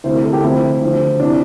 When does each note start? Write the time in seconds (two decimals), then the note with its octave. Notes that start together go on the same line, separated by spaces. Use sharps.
0.04 D2 C3 E3 C5
0.13 A#4
0.23 A4
0.33 G4
0.43 D2 C3 F3 E4
0.81 D2 D3 F3
1.20 C3 E3 D4